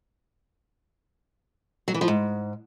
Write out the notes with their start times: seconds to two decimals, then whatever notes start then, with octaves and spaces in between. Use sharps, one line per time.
1.88 F#3
1.94 E3
2.01 F3
2.08 G#2